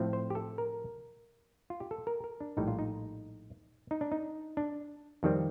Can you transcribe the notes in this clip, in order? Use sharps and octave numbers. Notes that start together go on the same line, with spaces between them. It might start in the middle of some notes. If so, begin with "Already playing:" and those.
Already playing: A2 F3 A3 C4
C5
G4
A4
A#4
F4
G4
A4
A#4
A#4
D4
A#1 A2 G3 D#4
F4
D#4
D#4
D4
D#4
D4
F2 D#3 G3 C4